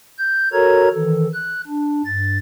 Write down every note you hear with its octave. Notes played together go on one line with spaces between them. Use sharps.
G6
F#4 A4 A#4 C#5 A#5 G#6
D#3 E3 A4
F#6
D4
G2 A6